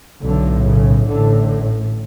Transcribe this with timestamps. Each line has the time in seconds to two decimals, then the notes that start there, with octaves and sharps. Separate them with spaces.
0.22 B1 A2 D3
0.64 C#3
1.06 A1 D3
1.12 A2